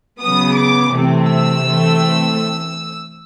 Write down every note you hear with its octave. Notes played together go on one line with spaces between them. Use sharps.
C#3 F#3 B3 D#6
D6
C3 E3 A3 C4
E6
E3 A3 C4